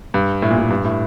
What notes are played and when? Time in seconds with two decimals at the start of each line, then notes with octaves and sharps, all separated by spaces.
0.14 G2
0.42 A2
0.50 A#2
0.58 A2
0.70 G2
0.85 A2